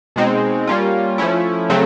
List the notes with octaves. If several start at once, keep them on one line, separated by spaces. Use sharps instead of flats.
B2 G#3 C4 D#4
G3 A#3 C#4 F4
F3 A3 C#4 E4
C#3 F#3 A3 C4